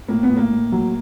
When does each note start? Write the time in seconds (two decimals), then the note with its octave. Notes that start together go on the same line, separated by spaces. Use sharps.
0.08 A2 A#3
0.23 B3
0.30 A2
0.37 A#3
0.51 A2
0.72 F#3